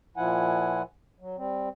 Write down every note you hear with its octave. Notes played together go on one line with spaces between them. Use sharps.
A#2 F3 E4 F#5 G#5
F#3
G3 C4